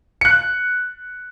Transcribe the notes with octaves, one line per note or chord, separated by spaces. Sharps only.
F#6 C#7